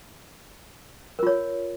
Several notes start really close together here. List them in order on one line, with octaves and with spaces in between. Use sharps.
A#4 F4 C#5